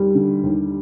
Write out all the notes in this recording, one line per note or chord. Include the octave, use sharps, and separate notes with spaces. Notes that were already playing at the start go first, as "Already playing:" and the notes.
Already playing: D#2 G3
D3
D#2